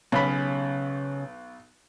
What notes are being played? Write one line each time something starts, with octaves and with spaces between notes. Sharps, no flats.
B1 C#3 C#4 B5